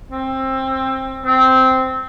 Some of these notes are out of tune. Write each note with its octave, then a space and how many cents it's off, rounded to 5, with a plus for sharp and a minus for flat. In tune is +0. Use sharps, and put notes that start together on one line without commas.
C4 +20
C4 -10